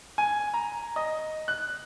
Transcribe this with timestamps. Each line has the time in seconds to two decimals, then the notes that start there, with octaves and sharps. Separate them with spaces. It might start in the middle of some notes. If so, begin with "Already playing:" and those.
0.18 G#5
0.54 A#5
0.96 D#5
1.48 F#6